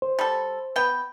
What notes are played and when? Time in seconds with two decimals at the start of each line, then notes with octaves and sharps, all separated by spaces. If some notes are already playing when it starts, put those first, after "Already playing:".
0.02 C5
0.19 G3 A4
0.76 B3 G5